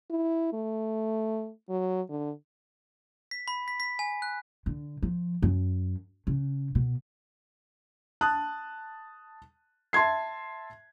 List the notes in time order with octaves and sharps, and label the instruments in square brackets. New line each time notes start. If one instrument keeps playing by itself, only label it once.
[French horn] E4
A3
F#3
D3
[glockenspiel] B6
B5
B6
B6
G#5
F#6
[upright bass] D3
F3
F#2
C#3
B2
[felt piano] A5 D#6 F#6
E5 A5 C6 G#6 C7